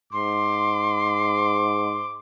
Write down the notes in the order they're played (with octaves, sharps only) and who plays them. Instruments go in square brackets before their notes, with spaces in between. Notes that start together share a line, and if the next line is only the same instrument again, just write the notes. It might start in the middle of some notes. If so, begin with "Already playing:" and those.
[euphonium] G#2 [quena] C6 [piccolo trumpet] D6